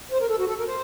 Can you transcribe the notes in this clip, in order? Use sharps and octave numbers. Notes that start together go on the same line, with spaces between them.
C5
A#4
A4
F#4
A4
A#4
C5